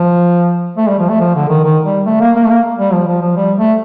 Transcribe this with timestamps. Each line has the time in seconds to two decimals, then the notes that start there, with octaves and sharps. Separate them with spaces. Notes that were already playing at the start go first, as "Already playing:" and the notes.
Already playing: F3
0.77 A3
0.88 G3
0.99 F3
1.09 A3
1.20 F3
1.35 D3
1.49 D#3
1.64 D#3
1.85 G3
2.06 A3
2.20 A#3
2.36 A#3
2.43 A3
2.50 A#3
2.79 G3
2.92 F3
3.07 F3
3.21 F3
3.36 G3
3.57 A3